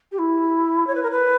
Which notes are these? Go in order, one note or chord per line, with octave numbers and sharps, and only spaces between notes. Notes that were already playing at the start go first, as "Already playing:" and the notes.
G4
E4
C#5
B4
A#4
B4